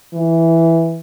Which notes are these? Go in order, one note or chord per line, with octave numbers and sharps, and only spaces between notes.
E3